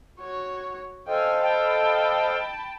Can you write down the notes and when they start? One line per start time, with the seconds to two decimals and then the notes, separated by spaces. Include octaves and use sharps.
0.20 F#4 C#5
1.08 A4 C5 D#5 F5 G5 G#5
1.43 G5 A5 B5